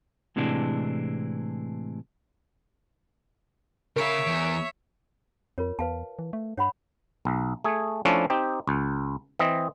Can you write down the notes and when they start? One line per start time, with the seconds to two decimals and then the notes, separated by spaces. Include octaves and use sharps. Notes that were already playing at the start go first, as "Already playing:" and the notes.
0.36 A2 C3 E3 G#3 D4
3.96 C#3 A#4 C#5 E5 F5 D7
4.27 E2
5.58 F2 F4 A#4 C#5
5.79 E2 B4 F5 A5
6.19 E3
6.33 A3
6.58 G2 C#5 F#5 B5
7.25 B1
7.64 A3 G#4
8.05 F3 A3 C#4 D4 E4
8.30 C4 D#4 G4
8.67 C#2
9.39 E3 C4 D#5